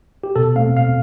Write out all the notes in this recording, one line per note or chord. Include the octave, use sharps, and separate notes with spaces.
G4
B2 A4
A3 C4 F5
B2 F5